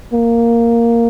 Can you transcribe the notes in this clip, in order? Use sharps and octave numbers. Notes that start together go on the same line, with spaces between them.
A#3